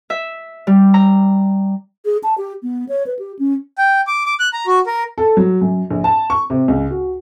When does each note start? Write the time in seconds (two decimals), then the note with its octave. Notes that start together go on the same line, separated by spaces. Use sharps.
0.10 E5
0.67 G3
0.94 A#5
2.05 G#4
2.23 A5
2.38 G4
2.63 B3
2.89 C#5
3.07 B4
3.19 G4
3.39 C#4
3.78 G5
4.07 D6
4.26 D6
4.40 F#6
4.53 A#5
4.67 F#4
4.87 A#4
5.18 A4
5.37 F#3
5.61 F#2
5.90 A#1
6.04 A5
6.30 C#6
6.50 C3
6.68 C#2
6.91 F#4